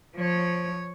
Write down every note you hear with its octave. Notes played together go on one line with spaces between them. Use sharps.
F3 C#5